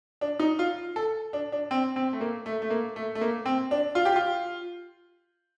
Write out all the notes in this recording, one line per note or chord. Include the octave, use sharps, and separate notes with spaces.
D4
D#4
F4
A4
D4
D4
C4
C4
A3
A#3
A3
A3
A#3
A3
A3
A#3
C4
D4
F4
G4
F4